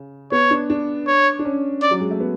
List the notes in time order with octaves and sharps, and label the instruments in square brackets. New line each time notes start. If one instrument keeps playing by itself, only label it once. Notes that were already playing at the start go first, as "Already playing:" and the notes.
Already playing: [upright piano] C#3
[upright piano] B3 [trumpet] C#5
[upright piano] D4
D4
[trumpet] C#5
[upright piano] D4
C#4
[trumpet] D5
[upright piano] F#3
G#3
A3
B3